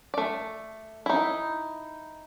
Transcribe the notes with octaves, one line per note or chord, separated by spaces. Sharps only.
A3 D5
D#4 E4